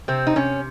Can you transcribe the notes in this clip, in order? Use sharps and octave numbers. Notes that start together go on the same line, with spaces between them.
C3 C4
D#4
C3 C#4